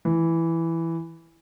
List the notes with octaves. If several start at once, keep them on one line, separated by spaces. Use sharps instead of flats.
E3